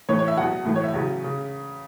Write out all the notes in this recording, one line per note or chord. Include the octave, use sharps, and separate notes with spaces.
A2 E3 C#5
C#5
E5
E2 B2 F#3 F#5
A2 E3
C#5
E5
E2 C#3 F#3
C#3